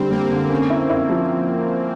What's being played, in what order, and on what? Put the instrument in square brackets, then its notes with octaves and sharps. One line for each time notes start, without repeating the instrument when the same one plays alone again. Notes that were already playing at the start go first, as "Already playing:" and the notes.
Already playing: [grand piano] D3 G3 [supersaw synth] C4
[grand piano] G3 [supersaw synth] A#3
[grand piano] D3
[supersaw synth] A#3 [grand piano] C#4
[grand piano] E4
E4
F3